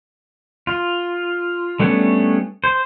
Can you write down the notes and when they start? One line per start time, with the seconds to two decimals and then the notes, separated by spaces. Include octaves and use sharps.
0.67 F4
1.80 G3 A3 B3 C#4 D4
2.64 C5